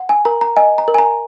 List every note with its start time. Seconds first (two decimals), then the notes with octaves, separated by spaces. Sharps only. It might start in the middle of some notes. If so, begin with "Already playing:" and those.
Already playing: F#5
0.09 G#5
0.25 A#4 A#5
0.41 A#5
0.56 D#5 G#5
0.78 A#5
0.88 A#4
0.94 G#5
0.98 A#5